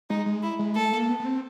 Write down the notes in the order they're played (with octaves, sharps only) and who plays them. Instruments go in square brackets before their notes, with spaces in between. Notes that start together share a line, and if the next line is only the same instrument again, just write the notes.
[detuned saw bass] G#3 [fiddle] D#4
[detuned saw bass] G#3
[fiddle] E4
[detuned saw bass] G#3
[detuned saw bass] A3 [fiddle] A4
[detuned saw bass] A#3
B3
B3
C4